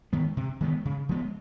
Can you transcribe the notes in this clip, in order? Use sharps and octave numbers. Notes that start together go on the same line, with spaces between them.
D#3 G#3 B3
C3
D#3 G#3 B3
C#3
F3 G#3 B3